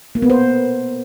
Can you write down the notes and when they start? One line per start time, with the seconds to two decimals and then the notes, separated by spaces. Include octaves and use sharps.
0.15 A#3
0.22 B3
0.30 C5